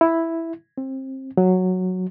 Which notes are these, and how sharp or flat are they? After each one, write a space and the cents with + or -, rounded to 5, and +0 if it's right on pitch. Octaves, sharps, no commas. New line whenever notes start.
E4 +0
C4 +25
F#3 -5